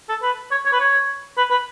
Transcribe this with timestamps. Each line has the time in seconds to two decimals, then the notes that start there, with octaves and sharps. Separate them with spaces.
0.09 A4
0.22 B4
0.51 C#5
0.66 C#5
0.73 B4
0.80 C#5
1.37 B4
1.51 B4